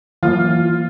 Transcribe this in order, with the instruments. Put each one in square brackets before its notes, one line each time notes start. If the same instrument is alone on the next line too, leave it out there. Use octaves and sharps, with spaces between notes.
[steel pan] E3 F#3 A#3 [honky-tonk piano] F4